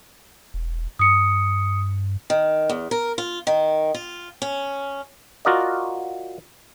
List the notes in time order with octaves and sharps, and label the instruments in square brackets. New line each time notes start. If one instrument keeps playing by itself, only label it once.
[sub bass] E1
[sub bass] G2 [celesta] D#6 C#7
[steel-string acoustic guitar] D#3
E2
A#4
F4
D#3
F4
C#4
[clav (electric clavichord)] F4 F#4 A#4 D5 D#5